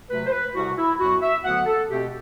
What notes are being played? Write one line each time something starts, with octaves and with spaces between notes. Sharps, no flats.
D2 C3 F#3 A3 B4
C5
B4
C2 C3 G3 F#4
E4
F#2 F#3 B3 F#4
E5
D2 D3 F#3 B3 F#5
A4
B2 A3 C4 G4